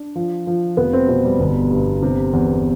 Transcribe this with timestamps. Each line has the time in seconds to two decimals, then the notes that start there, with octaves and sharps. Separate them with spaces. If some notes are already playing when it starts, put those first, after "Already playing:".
Already playing: D4
0.15 F3
0.47 F3
0.77 F1 B3
0.93 C4
1.09 B2 C4
1.25 G3
1.40 G1 G3
1.71 G2
2.02 C3
2.33 E2